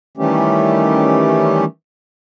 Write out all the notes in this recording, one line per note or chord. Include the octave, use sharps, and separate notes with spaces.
D#3 E3 G3 A3 C#4 G4